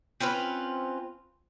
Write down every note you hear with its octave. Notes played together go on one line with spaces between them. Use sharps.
C4 C#4 F4 B4